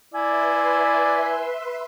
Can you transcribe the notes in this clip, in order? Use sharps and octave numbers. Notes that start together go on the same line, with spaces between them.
E4 B4 D5 E5 G#5 C6